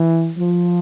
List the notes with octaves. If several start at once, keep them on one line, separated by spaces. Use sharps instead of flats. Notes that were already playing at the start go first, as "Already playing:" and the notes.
Already playing: E3
F3